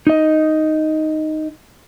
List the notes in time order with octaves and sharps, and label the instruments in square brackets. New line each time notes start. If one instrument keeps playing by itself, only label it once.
[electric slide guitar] D#4 D#5